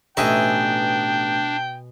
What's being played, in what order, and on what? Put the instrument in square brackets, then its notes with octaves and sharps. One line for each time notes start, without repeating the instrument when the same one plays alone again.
[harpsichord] A1 D#4 C#6 [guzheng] B2 E5 G#5 [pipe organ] D4 [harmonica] G5